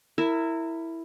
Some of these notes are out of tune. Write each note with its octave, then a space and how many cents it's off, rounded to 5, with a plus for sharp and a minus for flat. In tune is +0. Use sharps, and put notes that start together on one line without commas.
E4 +0 A#4 -25 E5 +0